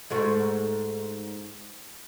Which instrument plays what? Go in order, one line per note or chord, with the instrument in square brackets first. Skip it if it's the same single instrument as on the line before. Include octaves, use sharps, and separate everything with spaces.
[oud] G#2 A3 F#4